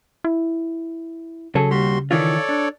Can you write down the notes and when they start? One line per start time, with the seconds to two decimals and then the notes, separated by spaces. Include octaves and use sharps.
0.25 E4
1.55 C#3 F#3 G#4 A4
1.71 D#2 G3 F#4 C6
2.11 D#3 E3 F4 A4 C#5 D5
2.49 D4